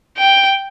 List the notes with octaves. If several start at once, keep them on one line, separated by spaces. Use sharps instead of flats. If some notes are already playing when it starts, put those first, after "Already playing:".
G5